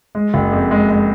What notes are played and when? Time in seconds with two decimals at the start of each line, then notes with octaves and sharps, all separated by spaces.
0.15 G#3
0.34 F#1
0.52 F2
0.71 G#3
0.90 G#3